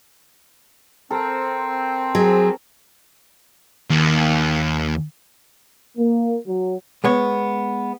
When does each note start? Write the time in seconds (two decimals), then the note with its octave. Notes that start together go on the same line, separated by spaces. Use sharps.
1.11 C4 A4 A#4
2.15 F#3 G#4
3.90 D#2
5.98 A#3
6.46 F#3
7.04 G#3 B3 C#5